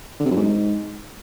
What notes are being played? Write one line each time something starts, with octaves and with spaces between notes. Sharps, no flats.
D3
C3
F#2
G#2